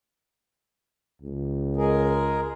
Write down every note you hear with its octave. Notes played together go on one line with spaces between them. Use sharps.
C#2
G#3 G#4 A#4